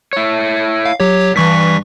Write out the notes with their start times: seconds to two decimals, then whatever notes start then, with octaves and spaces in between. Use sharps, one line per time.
0.13 E4 C#5
0.85 F5
1.00 F#3 G4 C#5
1.36 G2 E3 C#6 B6